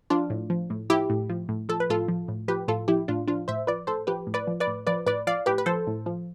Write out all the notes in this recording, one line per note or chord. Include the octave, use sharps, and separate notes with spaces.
F3 D4 F4
A2
F3
A2
F3 E4 G4
A2
F3
A2
F3 A4
B4
A2 F4 A4
F3
A2
F3 G4 B4
A2 F4 A4
F3 E4 G4
A2 D4 F4
F3 D4 F4
A2 C5 E5
F3 B4 D5
A2 A4 C5
F3 G4 B4
A2
B4 D5
F3
B4 D5
A2
F3 B4 D5
A2 B4 D5
F3 D5 F5
A2 G4 B4
B4
F3 A4 C5
A2
F3